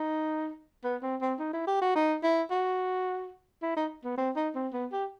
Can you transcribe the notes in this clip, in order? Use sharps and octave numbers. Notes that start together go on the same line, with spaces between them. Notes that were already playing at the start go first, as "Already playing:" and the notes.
Already playing: D#4
B3
C4
C4
D#4
E4
G4
F#4
D#4
E4
F#4
E4
D#4
B3
C4
D#4
C4
B3
G4